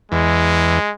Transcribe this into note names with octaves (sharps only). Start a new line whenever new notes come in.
E2 G#3